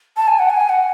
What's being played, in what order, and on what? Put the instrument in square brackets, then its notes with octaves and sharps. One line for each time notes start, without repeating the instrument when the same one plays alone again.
[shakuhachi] A5
G#5
F#5
G#5
F#5